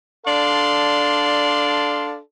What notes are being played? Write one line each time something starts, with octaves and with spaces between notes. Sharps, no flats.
D4 A4 D5 F5 C6